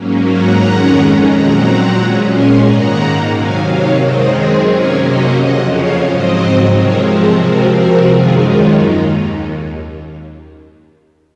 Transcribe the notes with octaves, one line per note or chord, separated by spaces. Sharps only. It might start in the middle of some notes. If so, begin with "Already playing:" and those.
Already playing: G#2 F#3 A#3 C#4
F#5 A#5
F2 D#3 G#3 C#4
A#2 F#3 C4 F#5 A#5
A#2 G#3 C#4
G#5 C6
G#2 D#3 A#3 F#5 A#5
C3 D#3 F#3 F5 G#5
C#5 F5
F#2 D#3 G#3 C4 C5 D#5
G#4 C5
C3 F#3 A#3 C#4 A#4 C#5
C5 D#5
F2 C#3 F3 D#5 F#5
C#5 F5
G#2 F#3 C4 C5 D#5
C3 F3 G#3 C4 A#4 C#5
G#4 C5
C3 F3 C4 F#4 A#4
F#4 A#4
F#2 D#3 G#3 F4 G#4
C#4 F4
D#2 D#4